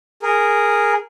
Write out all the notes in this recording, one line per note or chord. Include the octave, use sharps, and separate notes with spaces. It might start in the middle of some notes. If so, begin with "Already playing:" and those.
G#4 A#4